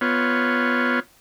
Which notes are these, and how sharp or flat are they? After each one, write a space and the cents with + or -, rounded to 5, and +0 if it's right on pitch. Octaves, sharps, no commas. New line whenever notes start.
B3 +0 F4 +0 C#5 +0